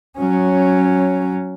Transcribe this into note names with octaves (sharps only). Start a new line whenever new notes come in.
F#3 C#4